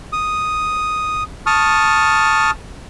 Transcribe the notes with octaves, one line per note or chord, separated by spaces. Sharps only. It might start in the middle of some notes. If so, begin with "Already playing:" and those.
D#6
A5 C#6 D#6 F6